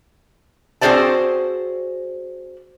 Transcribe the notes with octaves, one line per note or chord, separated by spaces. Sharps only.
C4 F#4 G#4 C5 D5 A5